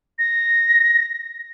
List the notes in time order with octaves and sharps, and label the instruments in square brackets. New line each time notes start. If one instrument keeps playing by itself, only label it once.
[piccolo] A#6